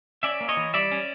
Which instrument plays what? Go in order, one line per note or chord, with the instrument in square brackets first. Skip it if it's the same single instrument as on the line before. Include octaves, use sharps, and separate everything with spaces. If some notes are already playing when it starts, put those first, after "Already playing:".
[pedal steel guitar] C#4 D5 E5
A#3
C#5 D#5
E3
G3 D5 E5
C#4